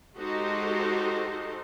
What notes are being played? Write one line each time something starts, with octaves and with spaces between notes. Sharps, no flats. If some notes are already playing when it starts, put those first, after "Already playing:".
G#3 D#4 F#4 G4 A4 C5